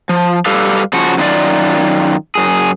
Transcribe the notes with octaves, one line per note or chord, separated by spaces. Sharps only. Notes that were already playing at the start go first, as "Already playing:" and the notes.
F3
G3 G4 A4 B4 F5
C#3 F3 F#4
F#2 D#3 F4 D5
F#2 G#4